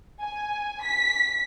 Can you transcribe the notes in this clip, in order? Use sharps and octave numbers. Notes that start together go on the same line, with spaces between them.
G#5
B6